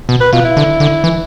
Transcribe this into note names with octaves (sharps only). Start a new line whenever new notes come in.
B2
B4
B2 F4
E4
D3
D3
E3